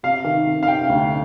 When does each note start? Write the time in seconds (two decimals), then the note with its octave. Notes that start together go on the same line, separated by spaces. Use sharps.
0.03 C3 F5
0.24 D#3
0.46 C3
0.63 F5
0.68 C3 G5
0.89 D2